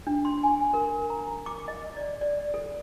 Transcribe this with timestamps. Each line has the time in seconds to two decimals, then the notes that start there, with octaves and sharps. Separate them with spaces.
0.07 D4
0.25 C6
0.43 G#5
0.74 A#4
1.10 A#5
1.46 D6
1.68 D#5
1.97 D5
2.21 D5
2.54 A4